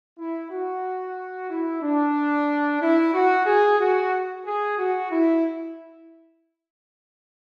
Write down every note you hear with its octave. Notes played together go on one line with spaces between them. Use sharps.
E4
F#4
E4
D4
E4
F#4
G#4
F#4
G#4
F#4
E4